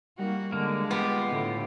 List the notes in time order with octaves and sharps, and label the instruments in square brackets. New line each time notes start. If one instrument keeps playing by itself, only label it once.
[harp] G3 D#4 A#4 [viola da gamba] A#3 F#4
[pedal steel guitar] D3 A#3 [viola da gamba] G#3
[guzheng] B3 [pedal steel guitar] F4 G4
[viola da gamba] A2 D3